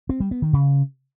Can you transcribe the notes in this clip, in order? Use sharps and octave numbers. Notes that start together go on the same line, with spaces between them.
C4
G3
B3
D#3
C#3